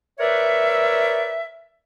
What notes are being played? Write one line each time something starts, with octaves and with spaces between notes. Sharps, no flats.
A#4 B4 C#5 D5 E5